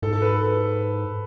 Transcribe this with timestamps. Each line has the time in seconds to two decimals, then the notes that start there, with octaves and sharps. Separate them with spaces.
0.02 G#2 A4
0.13 A4
0.22 B4
0.40 A4